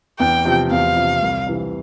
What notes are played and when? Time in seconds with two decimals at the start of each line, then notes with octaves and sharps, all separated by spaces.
0.19 E2 G5
0.45 C3 F3
0.71 E2 F5
0.96 C3 F3
1.22 C2
1.47 C3 E3